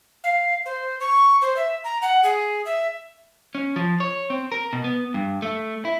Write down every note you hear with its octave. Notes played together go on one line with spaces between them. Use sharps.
F5
C5
C#6
C5
E5
A#5
F#5
G#4
E5
C#4
F3
C#5
C4
A#4
B2
B3
G2
A3
E4